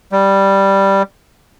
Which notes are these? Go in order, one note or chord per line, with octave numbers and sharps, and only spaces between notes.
G3